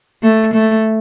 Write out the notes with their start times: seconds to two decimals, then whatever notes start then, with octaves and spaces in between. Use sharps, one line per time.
0.23 A3
0.54 A3